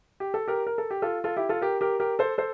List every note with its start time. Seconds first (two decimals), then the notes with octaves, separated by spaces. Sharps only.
0.20 G4
0.34 A4
0.48 G4 A#4
0.67 A#4
0.78 A4
0.91 G4
1.02 F4 A4
1.24 F4 A4
1.36 E4 G4
1.49 F4 A4
1.61 G4 A#4
1.81 G4 A#4
2.00 G4 A#4
2.19 A4 C5
2.38 A4 C5